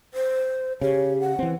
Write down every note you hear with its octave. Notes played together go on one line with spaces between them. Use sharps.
C5
C#3 G4 C#5
F#5
E3 C4